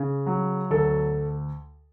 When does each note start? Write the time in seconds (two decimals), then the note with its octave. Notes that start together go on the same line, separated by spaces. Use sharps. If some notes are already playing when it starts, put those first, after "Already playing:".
Already playing: C#3
0.26 F#3
0.70 D2 A4